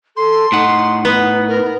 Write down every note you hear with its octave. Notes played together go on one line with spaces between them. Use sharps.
A4 C6
A2 D#4 F#5
B3
A#4